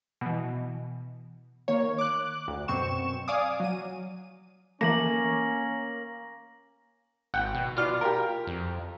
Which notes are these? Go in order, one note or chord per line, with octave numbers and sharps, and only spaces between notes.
B2 E3
D#3 A#3 C#5
D6 F#6
D2
F#2 B2 C4 C#6 E7
D5 F5 G#5 D6 D#6
F#3 D#7
E3 A3 A#3 C#4 A#6 F#7
G#1 F#5 G5
B2
B2 F4 D5 F6
G4 A#4
F2